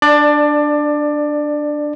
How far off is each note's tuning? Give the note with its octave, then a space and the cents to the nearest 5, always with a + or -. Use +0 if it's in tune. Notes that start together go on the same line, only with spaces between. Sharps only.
D4 +0 D5 +20